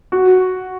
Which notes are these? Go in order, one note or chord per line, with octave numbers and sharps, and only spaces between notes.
F#4